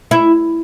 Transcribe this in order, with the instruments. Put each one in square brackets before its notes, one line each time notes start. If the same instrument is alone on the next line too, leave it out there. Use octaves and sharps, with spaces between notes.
[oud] E4